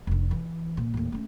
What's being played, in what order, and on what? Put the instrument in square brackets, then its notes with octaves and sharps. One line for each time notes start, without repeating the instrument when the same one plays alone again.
[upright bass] F1 D3
E3
A#2
D#2 A2
A3 C#4